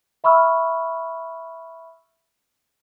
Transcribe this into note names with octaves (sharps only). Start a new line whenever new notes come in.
E5 B5 C#6 E6 F6